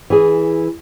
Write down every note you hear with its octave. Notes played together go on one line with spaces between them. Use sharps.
E3 G#4